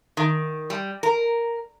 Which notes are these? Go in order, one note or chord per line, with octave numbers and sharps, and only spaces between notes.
D#3
G3
A#4